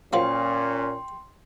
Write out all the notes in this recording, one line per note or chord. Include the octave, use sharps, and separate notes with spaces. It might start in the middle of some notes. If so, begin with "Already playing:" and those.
A#2 F3 F#3 A#3 C#4 G5 C6